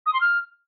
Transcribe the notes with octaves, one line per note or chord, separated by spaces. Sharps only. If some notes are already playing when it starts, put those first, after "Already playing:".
D#6
C6
F6